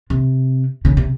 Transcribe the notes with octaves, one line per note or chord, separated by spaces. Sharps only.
C3
C#3
C3